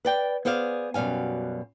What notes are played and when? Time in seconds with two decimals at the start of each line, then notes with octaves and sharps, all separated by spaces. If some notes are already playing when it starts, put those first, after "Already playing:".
0.05 B4 D5 G5
0.45 B3 G#4 C5 D5 F5
0.94 F#2 B2 G3 F5 G#5